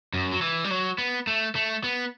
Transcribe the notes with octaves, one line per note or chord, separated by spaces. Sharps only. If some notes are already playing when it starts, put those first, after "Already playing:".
F#2
F#3
E3
G3
F#3
B3
A3
A3
B3